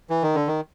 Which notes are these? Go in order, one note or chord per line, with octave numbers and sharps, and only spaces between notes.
E3
D#3
D3
D#3